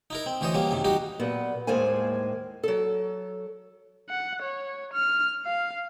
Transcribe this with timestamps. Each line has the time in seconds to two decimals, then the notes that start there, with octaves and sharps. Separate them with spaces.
0.10 D#4 E4 A#4
0.26 C4
0.41 D2 E3 C5 C#5 D#5
0.54 G3 A#3 B3 C#4
0.71 F#2 C3 D#3
0.85 G3 D#4 F#4 G4
1.20 A#2 F#3 B3
1.67 D#2 A2 G#3 A#3 C5 G#5
2.63 F#3 A4
4.09 F#5
4.42 C#5
4.93 F6
5.46 F5